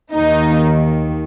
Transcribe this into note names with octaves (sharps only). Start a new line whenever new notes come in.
D#2 D#3 D#4